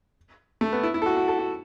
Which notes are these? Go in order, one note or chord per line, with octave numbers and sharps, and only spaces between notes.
A3
B3
E4
E4
A4
F#4
F#4
A4
F#4